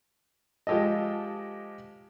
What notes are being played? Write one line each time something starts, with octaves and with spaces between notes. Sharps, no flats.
F3 G#3 G4 A4 D#5